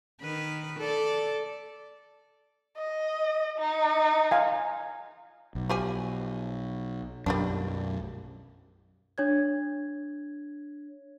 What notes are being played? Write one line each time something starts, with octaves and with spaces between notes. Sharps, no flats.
D#3 B4
A4 D5
D#5
D#4
F5 G#5
B1
F3 G4 G#5
B1 F#2 G3 A#3 D4
D4 C#5 G#6